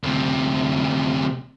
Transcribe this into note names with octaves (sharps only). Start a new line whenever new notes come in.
D2 C3